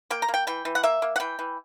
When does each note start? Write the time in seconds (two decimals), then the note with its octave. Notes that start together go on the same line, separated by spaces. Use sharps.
0.10 A#3 G5
0.22 A#5
0.28 A#3
0.34 G5
0.47 E3 G5
0.65 E3
0.75 F#5
0.83 A#3 E5
1.02 A#3
1.16 F#5
1.20 E3 G5
1.39 E3